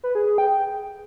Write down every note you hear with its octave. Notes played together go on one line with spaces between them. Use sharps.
B4
G#4
G#4
G5